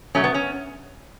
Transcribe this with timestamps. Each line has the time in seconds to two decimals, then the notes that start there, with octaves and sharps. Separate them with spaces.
0.15 B2 F#3 A3 C#4
0.24 B3
0.34 C#4